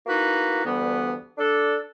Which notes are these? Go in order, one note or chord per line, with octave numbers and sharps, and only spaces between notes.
A#3 B3 D#4 E4 F#4 B4
D2 G2 E3 G3 B3
D4 A4